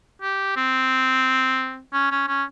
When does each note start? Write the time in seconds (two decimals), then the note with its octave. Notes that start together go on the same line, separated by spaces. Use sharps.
0.22 G4
0.57 C4
1.93 C#4
2.11 C#4
2.28 C#4